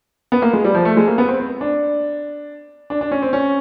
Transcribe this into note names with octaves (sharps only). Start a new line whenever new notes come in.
B3
A#3
G#3
G3
F3
A3
G#3
A#3
B3
C4
C4
D4
D4
D4
C#4
C4
C#4